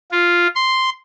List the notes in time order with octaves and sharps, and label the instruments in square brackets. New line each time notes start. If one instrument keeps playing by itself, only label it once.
[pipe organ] F4
C6